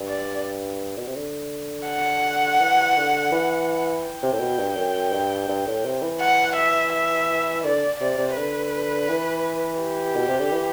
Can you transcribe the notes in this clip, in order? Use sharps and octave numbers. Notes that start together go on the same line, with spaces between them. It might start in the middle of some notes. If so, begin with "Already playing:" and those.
Already playing: G2
D5
B2
C3
D3
F#5
E3
D3
E3
G5
C3
A2
B2
G2
F#2
G2
G2
A2
C3
E3
F#5
E5
E5
D3 D5
C3 D5
C3
D3 B4
E3
G4
B2
C3
D3
E3